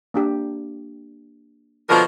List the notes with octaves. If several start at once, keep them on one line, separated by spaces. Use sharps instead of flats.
A#3 D4 G4
B2 D3 F3 A#4